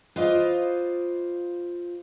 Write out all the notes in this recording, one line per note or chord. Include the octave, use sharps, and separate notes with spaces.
F4 B4 C5 D5 D#5 F5